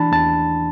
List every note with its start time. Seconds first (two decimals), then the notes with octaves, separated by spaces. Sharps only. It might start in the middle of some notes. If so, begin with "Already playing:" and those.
Already playing: E3 D4 A5 B5
0.12 E2 A5